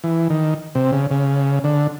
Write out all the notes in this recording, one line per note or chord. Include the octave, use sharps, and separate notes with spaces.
E3
D#3
C3
C#3
C#3
D3